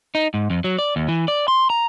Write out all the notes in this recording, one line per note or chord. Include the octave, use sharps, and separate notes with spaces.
D#4
G#2
F2
F#3
D5
D#2
E3
D5
C6
A#5